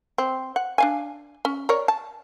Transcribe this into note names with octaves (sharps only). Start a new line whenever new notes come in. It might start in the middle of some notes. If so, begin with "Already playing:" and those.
C4
F#5
D4 F5 G#5
C#4
A#4 C#5 D5
A5